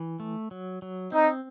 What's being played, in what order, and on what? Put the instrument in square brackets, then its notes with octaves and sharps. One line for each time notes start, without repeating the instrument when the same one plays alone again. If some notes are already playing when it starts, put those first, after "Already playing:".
Already playing: [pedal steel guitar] E3
A3
F#3
F#3
[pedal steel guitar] C4 [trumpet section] D#4